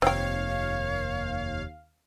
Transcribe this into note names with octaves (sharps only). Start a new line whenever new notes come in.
F1 D#2 C4 C#5 F5 G5